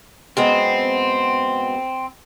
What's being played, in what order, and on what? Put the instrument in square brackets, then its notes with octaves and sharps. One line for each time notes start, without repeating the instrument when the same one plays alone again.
[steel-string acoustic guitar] F#2 G#3 B3 [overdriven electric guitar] C4